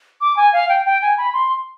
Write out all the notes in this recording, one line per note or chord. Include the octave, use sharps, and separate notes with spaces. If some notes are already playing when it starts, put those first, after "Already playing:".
D6
G#5
F5
G5
G5
G#5
B5
C6